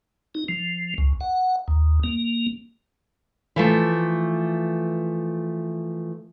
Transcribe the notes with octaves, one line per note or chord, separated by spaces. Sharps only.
D#4
F3
C#2
F#5
D#2
A#3
E3 F3 A3